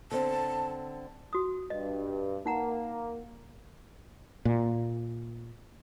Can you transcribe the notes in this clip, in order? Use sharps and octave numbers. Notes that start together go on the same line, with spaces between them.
D3 C4 A5
F#4 D#6
G2 D#5
A#3 D#4 F#5 A#5
A#2